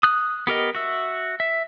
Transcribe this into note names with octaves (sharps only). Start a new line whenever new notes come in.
D#6 F#6
B3 G4 A#4 D#5
F#4 E5
E5